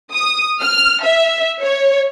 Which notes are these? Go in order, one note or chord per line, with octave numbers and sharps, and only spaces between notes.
D#6
F6
E5
C#5